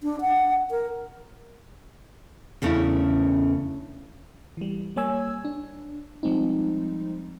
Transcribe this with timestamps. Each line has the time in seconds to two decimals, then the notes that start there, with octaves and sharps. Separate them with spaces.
0.03 D4
0.21 F#5
0.71 A#4
2.62 E2 C#3 A3 C#4 D4 E4
4.57 E3 G3
4.96 G3 A#3 C#5 G#5 E6 G#6
5.45 D4
6.23 F3 G3 G#3 C4 D#4